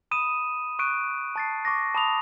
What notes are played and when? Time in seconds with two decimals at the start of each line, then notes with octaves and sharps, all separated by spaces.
0.11 B5 D#6 D#7 E7
0.79 C#6 D#6 F#6 D7 D#7
1.36 A5 A6 C7
1.65 C#6 D6 A#6
1.95 A5 B5 D#6 F7